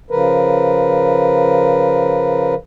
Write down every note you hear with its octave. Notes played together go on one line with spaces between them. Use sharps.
C#3 F3 A#4 B4